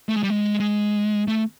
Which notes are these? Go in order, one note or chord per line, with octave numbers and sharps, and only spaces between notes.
A3
G#3
G3
G#3
G#3
A3